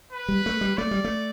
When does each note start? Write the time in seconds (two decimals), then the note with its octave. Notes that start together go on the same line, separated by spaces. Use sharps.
0.13 B4
0.28 G3
0.46 A3
0.61 G3
0.78 A3 D5
0.91 G3
1.04 A3